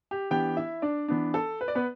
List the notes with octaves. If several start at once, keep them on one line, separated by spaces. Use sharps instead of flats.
G4
E3 B3 D4 G4 G5
E4 E5
D4 D5
E3 B3 D4
A4
B4
D5
B3 B4